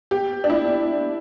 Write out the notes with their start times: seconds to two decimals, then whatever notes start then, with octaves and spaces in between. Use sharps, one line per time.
0.11 G4
0.44 D4
0.50 E4